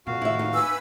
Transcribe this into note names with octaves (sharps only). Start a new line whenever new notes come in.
F2 A#2 F#4 F5
A2 D#3 E4 E5
D#2
B4 G#5 E6